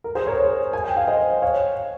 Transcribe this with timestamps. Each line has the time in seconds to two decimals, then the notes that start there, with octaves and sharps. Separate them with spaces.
0.04 A#4
0.15 G#4 C5
0.27 A#4 C#5
0.38 A#4 C#5
0.73 G#5
0.84 G5
0.97 F5
1.07 C5 D#5
1.42 C#5 F5